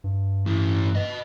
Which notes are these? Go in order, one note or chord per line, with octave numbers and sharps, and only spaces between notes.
G2
A2 E3
B4 D#5